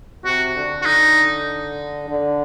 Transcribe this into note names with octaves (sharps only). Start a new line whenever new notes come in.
C3 F#4
D3
F#4
D#4
D3